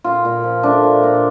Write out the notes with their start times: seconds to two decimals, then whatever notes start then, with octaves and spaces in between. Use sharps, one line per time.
0.04 A#2 F4
0.25 A#2
0.44 F3
0.63 A3 D4
0.84 A#2
1.03 A#2